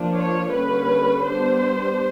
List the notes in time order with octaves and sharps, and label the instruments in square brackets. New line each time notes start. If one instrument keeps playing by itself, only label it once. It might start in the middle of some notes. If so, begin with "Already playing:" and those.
Already playing: [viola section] F3 A#3 D4
C#5
D3 G3 A#3 C#4 B4
G3 B3 D4 C5